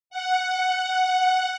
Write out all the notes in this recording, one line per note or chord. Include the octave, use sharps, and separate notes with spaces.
F#5